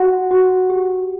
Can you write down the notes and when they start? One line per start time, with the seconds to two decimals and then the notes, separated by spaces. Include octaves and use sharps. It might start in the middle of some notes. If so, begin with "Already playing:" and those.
Already playing: F#4 F#5
0.31 F#4
0.70 G4